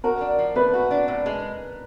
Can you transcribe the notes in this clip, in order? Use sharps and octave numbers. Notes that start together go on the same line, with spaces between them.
F#4 A#4
D4
F3
A3 B4
F#4
D4
A2
G#3